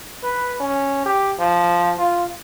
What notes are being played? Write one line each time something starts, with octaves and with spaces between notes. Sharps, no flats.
B4
C#4
G4
F3
F4